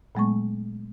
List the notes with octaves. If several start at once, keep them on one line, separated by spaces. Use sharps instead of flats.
A#2 F#3 G#3 A3 B3 C#6